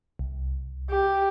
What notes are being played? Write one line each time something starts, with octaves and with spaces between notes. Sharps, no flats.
C2
G4